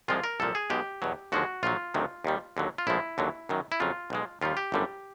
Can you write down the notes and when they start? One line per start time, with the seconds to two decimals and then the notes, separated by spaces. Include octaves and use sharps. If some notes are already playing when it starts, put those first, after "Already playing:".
0.08 C2 C3 F3 G#3 F4
0.24 A#4
0.40 C2 A#2 F3 A4
0.55 G#4
0.70 B1 B2 G#3 G4
1.02 E2 B2 F#3
1.32 D#2 D3 F3 G#3 F#4
1.63 A#1 A#2 F#3 F4
1.94 D2 C3 D#3 F#3
2.24 D#2 D#3 G3
2.57 D#2 D3 F#3
2.78 F4
2.87 A#1 A2 F3 G#3 E4
3.18 D#2 D3 F#3
3.49 F#2 D#3 F#3
3.72 E4
3.80 F2 C#3 F#3 F4
4.10 B1 B2 G#3
4.41 D#2 D#3 G3 F4
4.57 G4
4.72 G1 F#2 D3 G3